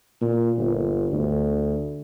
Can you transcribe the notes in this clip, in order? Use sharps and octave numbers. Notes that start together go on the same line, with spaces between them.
A#2
G1
D2